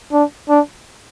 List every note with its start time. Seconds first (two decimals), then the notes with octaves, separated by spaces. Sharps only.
0.13 D4
0.50 D4